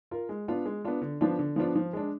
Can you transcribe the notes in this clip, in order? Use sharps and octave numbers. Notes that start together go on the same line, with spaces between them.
F4 A#4
G#3
B3 D4 F4
G#3
B3 D4 F4
D3
F3 B3 D4 F4
D3
F3 B3 D4 F4
F3
G#3 D4